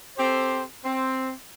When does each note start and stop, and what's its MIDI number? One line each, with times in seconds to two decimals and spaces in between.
0.18 0.62 60
0.18 0.62 67
0.18 0.62 69
0.18 0.62 72
0.85 1.31 60